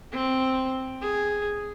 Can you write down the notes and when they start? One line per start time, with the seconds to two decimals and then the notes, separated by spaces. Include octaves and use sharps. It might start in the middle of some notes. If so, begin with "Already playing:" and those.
0.12 C4
1.01 G#4